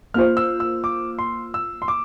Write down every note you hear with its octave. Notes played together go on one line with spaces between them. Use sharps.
A#3 F4 C5 F6
E6
E6
D6
C6
E6
C6
D6